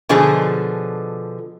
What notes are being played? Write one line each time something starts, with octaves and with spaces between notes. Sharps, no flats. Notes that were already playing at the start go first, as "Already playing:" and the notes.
B2 D3 F3 G#4